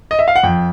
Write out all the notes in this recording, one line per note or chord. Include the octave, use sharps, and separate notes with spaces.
D#5
E5
F5
F#5
F2 G5